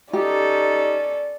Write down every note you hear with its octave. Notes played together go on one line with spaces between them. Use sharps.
C#4 D#4 G4 A4 D5